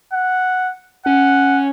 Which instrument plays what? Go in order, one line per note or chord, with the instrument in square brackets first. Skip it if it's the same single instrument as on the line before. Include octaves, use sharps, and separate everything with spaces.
[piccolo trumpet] F#5
[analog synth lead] C#4 [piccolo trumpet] F#5